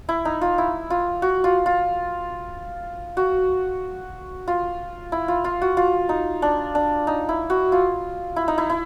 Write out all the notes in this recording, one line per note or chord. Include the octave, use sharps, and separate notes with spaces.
E4
D#4
F4
E4
F4
F#4
F4
F4
F#4
F4
E4
F4
F4
F#4
F4
D#4
D4
D4
D#4
E4
F#4
F4
E4
D#4
E4
E4